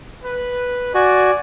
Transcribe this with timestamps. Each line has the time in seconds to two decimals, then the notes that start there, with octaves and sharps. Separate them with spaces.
0.24 B4
0.95 F#4 D5 G#5